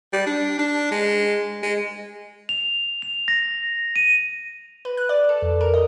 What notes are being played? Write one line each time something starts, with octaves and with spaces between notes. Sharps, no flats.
G3
D4
D4
G#3
G#3
F7
F7
A#6
D#7
B4
F#6
D5
A4
F2
A#4
D#5